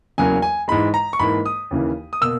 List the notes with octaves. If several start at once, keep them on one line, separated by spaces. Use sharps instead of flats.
E2 C#3 F#3 A#3 G#5
G#5
G#2 E3 G#3 B5
A#5
C#6
G#2 E3 A#3 B5
D#6
D#2 C#3 E3 A#3
D#6
B2 A#3 E6